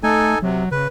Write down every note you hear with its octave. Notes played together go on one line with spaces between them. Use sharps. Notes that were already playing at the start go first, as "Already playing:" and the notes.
A3 D#4 A4 G#5
C3 F#3
C#3 B4